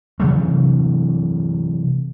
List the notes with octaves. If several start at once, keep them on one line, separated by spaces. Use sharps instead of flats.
C3 E3 F#3 A3